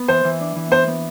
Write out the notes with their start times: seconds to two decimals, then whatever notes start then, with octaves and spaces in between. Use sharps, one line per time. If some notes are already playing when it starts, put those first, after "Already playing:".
Already playing: B3
0.08 E3 C5
0.24 E3
0.40 D4
0.55 E3
0.71 B3 C5
0.87 B3